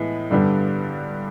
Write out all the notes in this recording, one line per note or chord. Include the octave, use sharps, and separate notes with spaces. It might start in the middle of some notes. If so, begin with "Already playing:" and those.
Already playing: A2 E3 G#3 B3
G2 D3 G3 B3